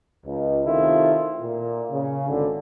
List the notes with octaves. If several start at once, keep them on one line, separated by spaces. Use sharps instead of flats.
C#2
C3 D#3 A3 E4 F4
A#2
C#3
G#1 D3